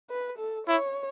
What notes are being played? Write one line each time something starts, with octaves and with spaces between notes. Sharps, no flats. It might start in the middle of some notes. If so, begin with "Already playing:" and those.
B4
A4
E4 C#5